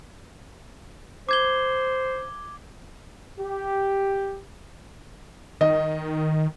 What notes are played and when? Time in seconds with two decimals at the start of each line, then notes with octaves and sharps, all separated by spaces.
1.29 C5 D6 G#6 G7
3.39 G4
5.61 D#3 D#5